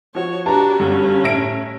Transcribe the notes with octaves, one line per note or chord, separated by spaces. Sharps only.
F3 F#4 C#5
D4 F#4 G4 B4 A5 A#5
G1 G2 D3 C#4
A2 E5 A#6 D7